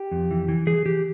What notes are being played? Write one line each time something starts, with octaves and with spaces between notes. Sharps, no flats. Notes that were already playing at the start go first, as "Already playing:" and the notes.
Already playing: G4
F2
E3
E3
E3 G#4
E3 G4